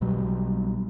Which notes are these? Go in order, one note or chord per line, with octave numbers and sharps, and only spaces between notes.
B1 B2 F#3 G3